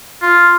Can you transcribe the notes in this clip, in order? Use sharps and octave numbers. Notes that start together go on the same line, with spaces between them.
F4